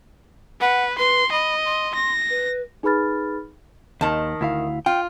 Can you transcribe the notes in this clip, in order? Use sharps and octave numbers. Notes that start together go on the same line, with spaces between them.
B4 F#5
B4 C6
D#5 B5
C6
A#6
B4
D#4 G#4 B4 B5 F6 A6
D#2 D#3 A5
D2 E4 F5
F4 G5